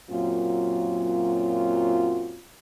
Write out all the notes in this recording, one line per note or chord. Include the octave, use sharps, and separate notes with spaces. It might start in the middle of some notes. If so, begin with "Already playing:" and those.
F#2 A#2 F#3 C4 F4